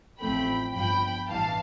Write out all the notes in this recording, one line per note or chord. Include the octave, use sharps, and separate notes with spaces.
A1 A2 F3 A3 C4 G5 B5
G1 G2 F3 G5 B5
A1 G2 E3 F5 A5